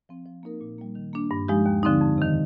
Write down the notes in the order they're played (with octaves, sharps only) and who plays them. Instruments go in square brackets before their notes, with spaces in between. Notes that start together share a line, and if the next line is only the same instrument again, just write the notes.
[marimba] F3 C4
F3
A#3 D#4 A#4
A#2
G3 A#3
D#3
A#3 D4
G2
F3 G#3 D#4 G4
D#2
D3 F3 C4 D#4
F2
C3 D#3